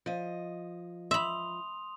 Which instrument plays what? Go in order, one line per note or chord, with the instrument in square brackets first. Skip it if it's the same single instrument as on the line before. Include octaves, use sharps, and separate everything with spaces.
[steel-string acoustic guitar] F3 D#5
[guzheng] E5 B5 [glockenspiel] C6 D#6 F7